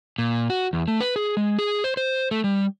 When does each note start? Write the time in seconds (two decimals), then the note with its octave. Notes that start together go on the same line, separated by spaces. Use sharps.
0.18 A#2
0.50 F#4
0.73 E2
0.88 A3
1.00 B4
1.16 G#4
1.37 G#3
1.59 G#4
1.84 C5
1.97 C5
2.31 A3
2.44 G3